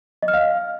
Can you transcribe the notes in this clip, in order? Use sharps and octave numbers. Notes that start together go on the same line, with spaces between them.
D#5
F6
F5